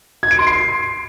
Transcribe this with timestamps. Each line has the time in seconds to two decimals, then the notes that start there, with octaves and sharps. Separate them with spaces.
0.23 G#6
0.31 D7
0.39 C6
0.47 C7